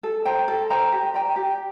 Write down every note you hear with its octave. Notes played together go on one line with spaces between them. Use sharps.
A4
C5 G5 A#5
A4
C5 G5 A#5
G4
D5 G5 A#5
G4